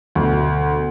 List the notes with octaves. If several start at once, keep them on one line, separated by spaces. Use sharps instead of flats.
D2 B2